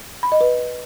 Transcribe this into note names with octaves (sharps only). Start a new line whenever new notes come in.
B5
D#5
B4